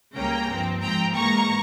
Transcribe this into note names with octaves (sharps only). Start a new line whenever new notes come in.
C#2 C#3 G3 A#3 C#4 G5 A#5
G2 F3 C4
G#2 F3 C4 G5 A#5
G#2 E3 A#3 A#5 C#6